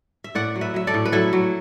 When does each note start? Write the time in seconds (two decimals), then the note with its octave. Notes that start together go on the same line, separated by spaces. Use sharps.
0.24 E5
0.35 A2 D5 F#5
0.56 F#3
0.61 B4 E5
0.74 F#3 E5
0.87 A4 D5
0.94 A2
1.05 B4
1.12 F#3 E4 A4
1.33 F#3